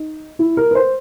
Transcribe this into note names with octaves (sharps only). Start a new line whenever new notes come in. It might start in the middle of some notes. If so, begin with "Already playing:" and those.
Already playing: D#4
E4
A#4
B4
C5